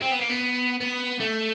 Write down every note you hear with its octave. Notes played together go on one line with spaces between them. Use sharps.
C4
B3
A#3
B3
B3
A3